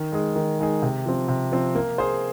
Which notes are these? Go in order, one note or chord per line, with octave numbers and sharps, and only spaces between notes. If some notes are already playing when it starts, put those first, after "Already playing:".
Already playing: D#3
G#3 D#4 G#4
D#3
G#3 D#4 G#4
C3
F3 C4
C3
F3 C4
A#3
G#4 C5